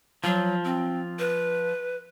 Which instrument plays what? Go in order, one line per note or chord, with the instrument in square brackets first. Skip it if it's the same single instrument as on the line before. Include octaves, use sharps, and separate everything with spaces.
[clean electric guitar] F3 [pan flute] F#3
[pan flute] C4
B4